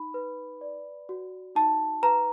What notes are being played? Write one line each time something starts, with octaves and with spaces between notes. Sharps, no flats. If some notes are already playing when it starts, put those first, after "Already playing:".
Already playing: D#4 B5
B4
D5
F#4
D#4 A5
B4 A#5